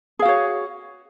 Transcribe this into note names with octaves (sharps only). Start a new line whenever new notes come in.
F#4 G#4 C#5 F5